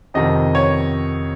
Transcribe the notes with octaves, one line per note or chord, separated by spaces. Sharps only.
F2 C3 D#3 D#5
C#5